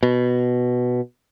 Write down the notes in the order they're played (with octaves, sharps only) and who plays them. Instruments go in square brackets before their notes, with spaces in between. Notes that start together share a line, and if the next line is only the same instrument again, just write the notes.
[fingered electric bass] B2